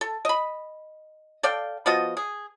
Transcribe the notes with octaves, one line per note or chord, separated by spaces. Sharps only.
A4
D#5 B5
A4 D5 F5 G5
F3 B3 F#4 D#5
G#4